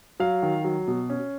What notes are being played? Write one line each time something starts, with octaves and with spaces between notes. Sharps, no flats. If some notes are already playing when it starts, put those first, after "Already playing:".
F#3 F5
D#3
F#3
B2
C#4